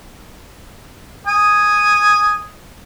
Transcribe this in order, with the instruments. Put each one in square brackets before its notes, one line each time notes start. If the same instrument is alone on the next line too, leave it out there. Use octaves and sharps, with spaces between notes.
[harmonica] G#5 D#6